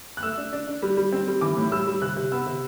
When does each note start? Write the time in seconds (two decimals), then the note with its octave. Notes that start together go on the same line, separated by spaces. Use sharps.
0.17 F#6
0.23 A3 E6
0.37 D4
0.53 D4
0.67 D4
0.82 G3
0.97 G3
1.12 C4
1.28 G3
1.41 E3 D6
1.57 A2
1.72 G3 E6
1.87 G3
2.02 C3 F#6
2.16 C3
2.32 B3 E6
2.47 C3